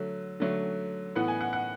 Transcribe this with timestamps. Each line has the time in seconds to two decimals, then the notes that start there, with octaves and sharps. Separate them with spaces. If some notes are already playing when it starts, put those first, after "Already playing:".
Already playing: D3 F#3 A3
0.40 D3 F#3 A3
1.16 A2 E3 B3 F#5
1.28 G#5
1.41 F#5
1.53 F#5